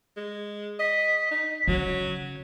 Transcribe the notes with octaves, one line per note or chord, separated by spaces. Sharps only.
G#3
D#5 B6
D#4
C#3 F#3